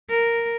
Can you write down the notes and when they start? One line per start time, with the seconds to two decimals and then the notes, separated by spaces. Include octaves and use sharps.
0.10 A#4